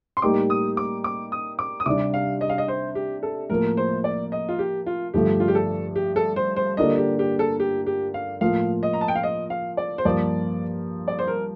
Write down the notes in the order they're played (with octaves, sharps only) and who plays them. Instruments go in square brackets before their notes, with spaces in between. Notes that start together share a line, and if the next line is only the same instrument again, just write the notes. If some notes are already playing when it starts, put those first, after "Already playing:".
[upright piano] C6
[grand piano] A2 G3 A#3 D#4 G4 [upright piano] D6
[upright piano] D#6
D6
D6
D#6
D6
D#6
[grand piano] C3 G3 D4 [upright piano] D6
[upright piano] F5
D#5
F5
D#5
C5
G4
A4
[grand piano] A2 F3 A#3 [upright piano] A#4
[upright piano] C5
D5
D#5
F4
G4
F4
[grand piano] G2 D3 F3 A3 [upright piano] G4
[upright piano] F4
G4
A4
G4
A4
C5
C5
[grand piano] D3 G3 A#3 D4 F4 [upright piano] D#5
[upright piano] G4
G4
A4
G4
G4
F5
[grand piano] A2 F3 A#3 F4 [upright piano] F5
[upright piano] D#5
A#5
A5
G5
F5
D#5
F5
D5
C5
[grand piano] G2 F3 A#3 F4 [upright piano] D5
[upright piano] D5
C5
A#4